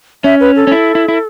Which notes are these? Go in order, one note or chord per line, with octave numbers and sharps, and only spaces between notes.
C#4 E5
B4
A4
C#4
E4
E4
E4